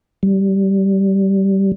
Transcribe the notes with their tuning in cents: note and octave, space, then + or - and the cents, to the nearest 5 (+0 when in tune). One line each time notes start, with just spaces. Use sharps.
G3 -15